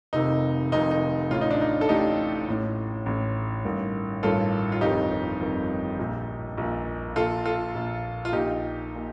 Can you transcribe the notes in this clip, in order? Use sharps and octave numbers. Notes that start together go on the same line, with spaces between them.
F1 F2 C3 D#3 D#4
F1 F2 C3 D#3 D#4
D#4
A1 A2 F4
D#4
D4
D#4
A4
A1 A2 D#4 G4
A1 A2
A1 A2
A1 G2 D#3
A1 G2 D#3 F4 A4
F4
G1 F2 D#3 D#4 G4
G1 F2 D#3
A#1 A#2
A#1 A#2
A#1 A#2 F4 A4
F4 A4
A#1 A#2
F4
A#1 A#2 D#4 G4
A#2